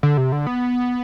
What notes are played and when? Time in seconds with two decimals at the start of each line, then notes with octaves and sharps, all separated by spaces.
0.03 D3
0.17 C3
0.32 D3
0.47 B3